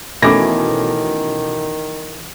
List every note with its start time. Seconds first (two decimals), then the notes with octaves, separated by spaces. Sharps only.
0.22 B2 D#3 E3 A3 C#4 D6 A#6